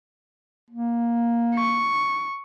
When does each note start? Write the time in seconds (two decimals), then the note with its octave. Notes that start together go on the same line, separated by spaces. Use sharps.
0.70 A#3
1.55 C#6